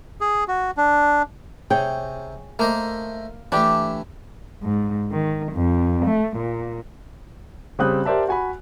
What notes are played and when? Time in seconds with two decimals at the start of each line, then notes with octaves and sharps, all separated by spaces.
0.21 G#4
0.48 F#4
0.77 D4
1.71 C3 G#4 C#5 G5
2.59 A3 A#3 C5 D#5
3.52 E3 A3 D4 G4
4.63 G#2
5.12 D#3
5.52 F2
6.06 A3
6.37 A#2
7.79 C#3 G3 C4 D#6 F#6
8.05 G4 A#4 C5 D5 E5 A5
8.28 F#4 G#5 B5